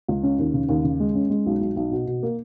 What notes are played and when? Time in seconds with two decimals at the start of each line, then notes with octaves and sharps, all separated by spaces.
0.08 C#2
0.23 C#4
0.39 D#2
0.54 C#3
0.69 D#2
0.84 C#3
1.00 G#3
1.15 C#4
1.30 G#3
1.46 B1
1.61 B1
1.76 B1
1.92 B2
2.07 B2
2.23 A#3